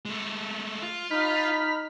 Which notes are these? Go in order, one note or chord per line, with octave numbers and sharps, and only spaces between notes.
G#3 A3
F4
D#4 B5 F6